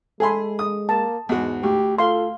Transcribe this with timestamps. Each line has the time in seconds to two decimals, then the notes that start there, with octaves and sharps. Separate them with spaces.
0.20 G#3 G#4 A4 G#5 B5 C6
0.59 D#6
0.89 A#3 A5
1.29 E2 G#2 G#3 F#4
1.63 D2 G4
1.98 F4 A4 F5 C6